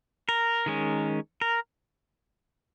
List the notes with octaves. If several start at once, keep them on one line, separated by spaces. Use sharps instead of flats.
A#4
D#3 G#3 C#4
A#4